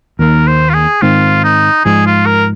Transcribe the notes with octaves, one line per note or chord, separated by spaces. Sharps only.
D#2 D#3 A#3 A#4
C5
F4
G#4
G#2 D#3 C4 F4
D#4
G#2 F3 G#3 G#4
F4
A#4